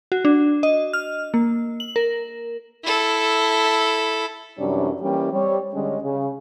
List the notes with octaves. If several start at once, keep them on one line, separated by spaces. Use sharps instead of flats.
F#4
D4
D#5
F6
A#3
F#7
A#4
E4 A4
F#2 C3 E3 G3 C#4 D4
E3 G3 A#3 C#4 G4
G3 C4 C#5
D3 G3 G#3 C#4
C#3